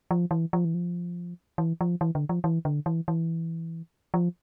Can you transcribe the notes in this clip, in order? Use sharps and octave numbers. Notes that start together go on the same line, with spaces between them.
F3
E3
F3
E3
F3
E3
F3
E3
D3
F3
E3
D3
E3
E3
F3